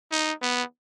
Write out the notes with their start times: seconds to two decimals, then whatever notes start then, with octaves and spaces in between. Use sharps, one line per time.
0.12 D#4
0.42 B3